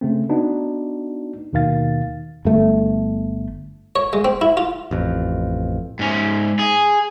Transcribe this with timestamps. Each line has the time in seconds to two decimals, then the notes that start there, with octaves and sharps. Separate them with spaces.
0.01 C#3 A3 C4
0.29 B3 D4 D#4 F#4
1.53 D#2 B2 D#3 F5 A6
2.45 G1 A3
3.96 C#5
4.13 G#3
4.25 C4
4.41 E4
4.57 F4
4.91 A1 F2
5.99 G#2 C#4
6.59 G#4